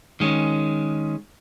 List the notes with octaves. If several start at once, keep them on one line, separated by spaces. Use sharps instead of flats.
D#3 G#3 C#4